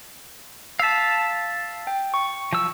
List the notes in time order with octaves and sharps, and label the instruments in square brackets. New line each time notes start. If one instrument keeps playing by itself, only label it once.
[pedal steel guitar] F5 A5 [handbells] E6 B6
[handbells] G5
C#6
[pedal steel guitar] F3 E6